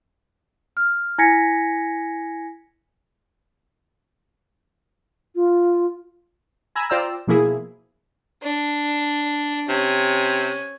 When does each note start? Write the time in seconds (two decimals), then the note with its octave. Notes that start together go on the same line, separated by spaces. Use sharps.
0.77 F6
1.18 E4 G#5 G#6 A#6 B6 C#7
5.36 F4
6.76 G#5 A#5 B5 E6
6.90 F4 C5 D5 G5 A#5 E6
7.27 B2 F3 A#3 E4 G#4
8.43 D4
9.69 C3 C#4 G#5